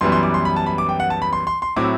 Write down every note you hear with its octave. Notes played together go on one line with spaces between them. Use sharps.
F#2 E3 G3 B3 C6
C6
D6
C6
B5
A5
B5
D6
G5
F#5
A5
B5
C6
C6
C6
A2 F#3 C4 E4 D6